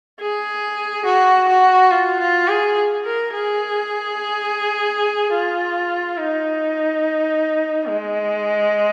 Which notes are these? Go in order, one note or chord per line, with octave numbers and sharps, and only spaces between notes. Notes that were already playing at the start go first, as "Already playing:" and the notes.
G#4
F#4
F#4
F4
F4
G#4
A#4
G#4
F4
D#4
G#3